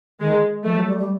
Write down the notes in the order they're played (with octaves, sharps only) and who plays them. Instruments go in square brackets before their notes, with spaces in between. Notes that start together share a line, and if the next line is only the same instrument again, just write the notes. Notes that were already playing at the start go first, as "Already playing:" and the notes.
[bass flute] D#3 [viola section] G#3
[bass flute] F3 [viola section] A3
[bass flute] F#3
G3
G3